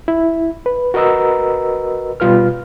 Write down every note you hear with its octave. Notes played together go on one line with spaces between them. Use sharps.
E4
B4
F#4 A#4 B4 D#5 A#5 E6
B2 G3 F4 B4 F6